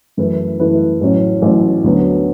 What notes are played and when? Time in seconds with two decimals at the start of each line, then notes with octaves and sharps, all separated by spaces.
0.17 F#2 E3 A3 E4 B4
0.60 F#2 E3 A3 E4 B4
1.01 A1 A2 F#3 C#4
1.42 A1 A2 F#3 C#4
1.84 D2 D3 F#3 B3